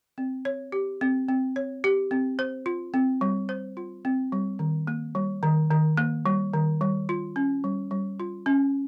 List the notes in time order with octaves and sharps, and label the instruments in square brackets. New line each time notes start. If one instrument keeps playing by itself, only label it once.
[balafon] C4
C#5
G4
C4
C4
C#5
G4
C4
C5
F4
C4
G3
C5
F4
C4
G3
D#3
A#3
G3
D#3
D#3
A#3
G3
D#3
G3
F4
C#4
G3
G3
F4
C#4